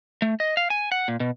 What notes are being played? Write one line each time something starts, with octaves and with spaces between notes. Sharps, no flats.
A3
D#5
F5
G#5
F#5
A#2
B2